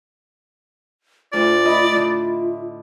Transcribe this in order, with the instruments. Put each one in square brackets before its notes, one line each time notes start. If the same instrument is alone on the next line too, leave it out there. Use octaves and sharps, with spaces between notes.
[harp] D2 A2 [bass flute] F4 [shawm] D5
[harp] E4 D#5 B5
[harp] A2 D3 [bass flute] F4